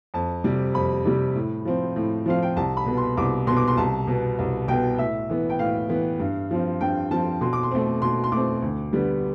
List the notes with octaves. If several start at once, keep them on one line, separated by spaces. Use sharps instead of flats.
F2 A5
C3 G3
F2 B5
C3 G3
A2
F3 C4
A2
F3 C4 F5
G5
C2 A5
B5
B2 B3
C6
C2 D6
B2 B3 C6
D6
C6
C2 A5
B2 B3
C2
B2 B3 G5
A2 E5
E3 B3
G5
A2 F5
E3 B3
G2
F3 C4
G2 G5
F3 C4 A5
B2 C6
D6
C6
A3 C4
B2 C6
C6
A3 C4 D6
D2
D3 G3 B3